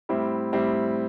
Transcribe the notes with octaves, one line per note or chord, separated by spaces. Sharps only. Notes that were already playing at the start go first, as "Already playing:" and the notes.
A2 G3 C4 E4
A2 G3 C4 E4